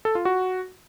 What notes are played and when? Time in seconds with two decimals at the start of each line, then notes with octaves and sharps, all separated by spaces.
0.05 A4
0.15 F4
0.25 F#4